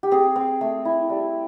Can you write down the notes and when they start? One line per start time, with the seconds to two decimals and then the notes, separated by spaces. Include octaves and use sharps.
0.03 G4
0.11 C4 G#4
0.36 C4
0.61 A3
0.85 E4
1.10 G3